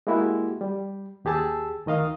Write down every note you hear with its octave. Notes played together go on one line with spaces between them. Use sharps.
G#3 A#3 E4 F#4 G4
G3
D#2 G4 G#4 A5 E6
D2 D#3 D#5 F5 D#6